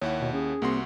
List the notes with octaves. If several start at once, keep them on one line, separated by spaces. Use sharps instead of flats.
D#2 E4 C#5 F#5
B2
C#4 G#4
C2 A#3 C4 F#4 C6